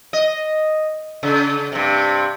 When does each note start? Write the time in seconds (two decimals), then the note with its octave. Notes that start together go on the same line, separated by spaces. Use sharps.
0.13 D#5
1.23 C#3
1.72 G2 C3